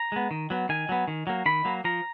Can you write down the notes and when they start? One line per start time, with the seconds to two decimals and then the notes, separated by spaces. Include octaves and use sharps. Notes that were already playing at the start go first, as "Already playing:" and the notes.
Already playing: A#5
0.12 G#3 B3
0.31 D#3
0.50 F#3 B3
0.69 D#3 G#5
0.89 F#3 B3
1.08 D#3
1.27 F#3 A#3
1.46 D#3 B5
1.65 F#3 A#3
1.84 F3 A#5